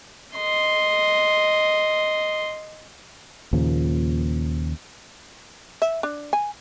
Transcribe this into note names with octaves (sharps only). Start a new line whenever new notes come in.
D#5 C6
D#2 A#2 C#3 F3
E5
D4
G#5